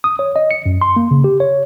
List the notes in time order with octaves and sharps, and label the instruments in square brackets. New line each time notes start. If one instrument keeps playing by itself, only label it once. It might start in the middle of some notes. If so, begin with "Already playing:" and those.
[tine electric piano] D#6
C#5
D#5
C#7
F#2
C6
A#3
C#3
G4
C#5